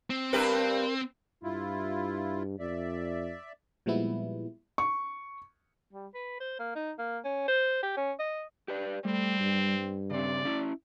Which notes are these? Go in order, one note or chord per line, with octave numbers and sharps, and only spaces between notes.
C4
G2 G4 A#4 B4
G2 E4 F4
F2 D5 E5
A#2 F3 G3 G#3 B3 E4
C#6
G3
B4
C5
A#3
D#4
A#3
C#4
C5
G4
C#4
D#5
G4 B4 D5
G3 A3 C4
G2
C#3 C4 D5
C#4 E4